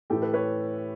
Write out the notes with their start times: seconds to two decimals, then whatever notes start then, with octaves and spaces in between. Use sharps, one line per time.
0.10 A2 E3 G4 A4
0.22 A4 B4
0.33 B4 C#5